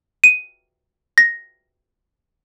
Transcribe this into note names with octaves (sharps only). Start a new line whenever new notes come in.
D#7
A#6